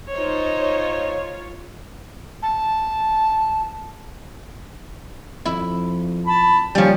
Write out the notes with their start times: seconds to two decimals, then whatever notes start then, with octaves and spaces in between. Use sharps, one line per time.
0.14 D#4 F4 C5 C#5
2.42 A5
5.45 F2 E4
6.27 A5 B5
6.75 D#1 F3 G3 C#4